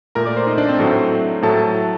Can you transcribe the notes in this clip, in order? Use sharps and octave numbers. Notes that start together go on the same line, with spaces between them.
A#2 A3 A#4 A#5
D5 D6
C5 C6
D#4 D#5
D4 D5
C4 C5
A2 F#3 A3
A2 F#3 A3 A4 A5